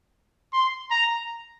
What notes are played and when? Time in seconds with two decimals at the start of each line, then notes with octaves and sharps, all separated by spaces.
0.53 C6
0.91 A#5